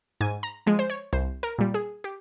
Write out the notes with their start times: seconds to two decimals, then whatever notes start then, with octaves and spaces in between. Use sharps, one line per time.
0.21 G#2 G#5
0.43 A#5
0.67 F3 G#3 G#5
0.79 C5
0.90 C#5
1.13 C2 C5
1.43 A#4
1.58 A#2 G3
1.74 G#4
2.04 G4